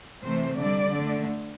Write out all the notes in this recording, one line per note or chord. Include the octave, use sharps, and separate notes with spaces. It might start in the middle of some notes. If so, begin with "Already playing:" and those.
C3 E3 A3 C5
D3 G3 D5
D3 A3